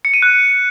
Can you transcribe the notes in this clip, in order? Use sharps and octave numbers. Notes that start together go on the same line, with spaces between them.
C#7
D#7
F#6